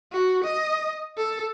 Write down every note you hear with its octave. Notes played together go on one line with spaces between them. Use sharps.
F#4
D#5
A4